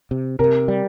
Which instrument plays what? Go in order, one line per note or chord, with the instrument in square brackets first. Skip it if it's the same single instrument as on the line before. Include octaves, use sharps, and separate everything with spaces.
[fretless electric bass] C3
[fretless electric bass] C3 [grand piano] A#4
[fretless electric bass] G3